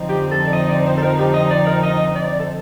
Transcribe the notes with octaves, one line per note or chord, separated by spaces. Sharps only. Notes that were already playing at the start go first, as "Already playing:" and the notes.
Already playing: F2 D3 F3 C4 D#4
G4
A4
D5
D#5
D5
C5
A4
A#4
G4
D#5
D5
A#4
D#5
D5
A4